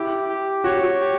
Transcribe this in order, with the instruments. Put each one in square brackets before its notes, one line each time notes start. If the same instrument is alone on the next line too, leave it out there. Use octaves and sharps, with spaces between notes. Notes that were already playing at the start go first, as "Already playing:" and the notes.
Already playing: [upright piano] E4 [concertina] G4
[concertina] G4
[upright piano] F#4 [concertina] C#5
[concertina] G4